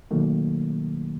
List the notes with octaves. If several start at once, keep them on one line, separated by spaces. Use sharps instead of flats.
B2 D#3 F#3 A3 A#3